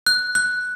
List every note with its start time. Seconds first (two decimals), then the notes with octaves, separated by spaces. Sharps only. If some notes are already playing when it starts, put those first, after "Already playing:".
0.07 F#6
0.35 F#6